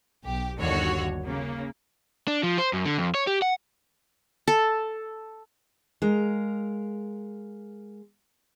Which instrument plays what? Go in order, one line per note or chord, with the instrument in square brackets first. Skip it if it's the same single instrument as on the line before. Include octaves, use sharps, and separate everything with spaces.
[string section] B1 G4
G1 D#2 D3 F#4 C#5
C#3 A#3
[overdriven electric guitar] D4
F3
C5
F#2
D3
F2
C#5
G4
F#5
[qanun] A4
[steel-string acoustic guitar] G#3 A#4 F5